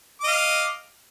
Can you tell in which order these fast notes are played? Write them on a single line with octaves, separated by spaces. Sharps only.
D6 D#5 F5